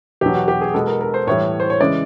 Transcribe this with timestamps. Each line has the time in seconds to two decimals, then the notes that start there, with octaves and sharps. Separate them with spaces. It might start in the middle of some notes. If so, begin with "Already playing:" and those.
0.21 E2 B2 F#3 G4
0.35 F#4
0.48 G4
0.61 G#4
0.74 B2 G#3 B3 A4
0.87 A#4
1.01 A#4
1.14 C5
1.27 A2 E3 G3 C#5
1.60 C5
1.70 C#5
1.80 C#3 E3 G#3 D5